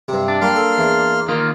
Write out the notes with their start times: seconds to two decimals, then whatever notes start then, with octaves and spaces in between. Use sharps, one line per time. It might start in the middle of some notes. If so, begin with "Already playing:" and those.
0.08 G2 C3
0.28 D4
0.42 G3 A#3 C6 F6
0.56 A4
0.78 E2
1.28 D#3 A#3 F4